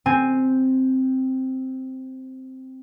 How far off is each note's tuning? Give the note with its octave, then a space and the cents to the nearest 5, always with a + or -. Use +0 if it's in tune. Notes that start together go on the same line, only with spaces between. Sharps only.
C4 +0 G#5 -5